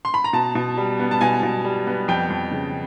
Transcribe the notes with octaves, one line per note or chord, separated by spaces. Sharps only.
C6
B5
A#5
B2 A5
B2
G3
B3
A5
B2 G#5
B2
G3
B3
F2 G5
F2
C#3